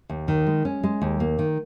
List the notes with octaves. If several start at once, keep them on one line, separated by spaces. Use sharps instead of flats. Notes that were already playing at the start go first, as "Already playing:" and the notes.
D#2
D#3
G#3
C#4
G#3
D#2
A#3
D#3